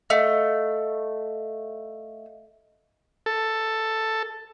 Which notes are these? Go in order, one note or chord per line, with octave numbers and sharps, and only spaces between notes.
A3 D#5 F5
A4